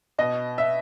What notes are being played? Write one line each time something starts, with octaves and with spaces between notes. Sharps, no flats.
B2 D#5
E5